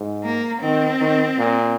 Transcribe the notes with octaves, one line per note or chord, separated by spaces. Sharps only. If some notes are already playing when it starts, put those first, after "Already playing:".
Already playing: G#2
A#3
D#3 C4
D#3
A#2